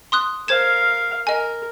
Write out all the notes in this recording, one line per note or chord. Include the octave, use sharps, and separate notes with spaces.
C6 D#6 F#6
A#4 C5 F5 G#6 E7
A#4 D#5 G#5